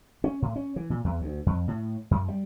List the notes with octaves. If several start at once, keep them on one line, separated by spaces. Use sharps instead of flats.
C#4
A2
C#4
E3
A#2
E2
D2
F2
A2
F#2
G3